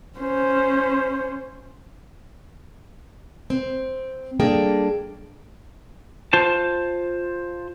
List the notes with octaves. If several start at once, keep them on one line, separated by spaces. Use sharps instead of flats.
C#4 C5
C4
G3 A#3 D4 G#4 A4 G5
F4 C5 A5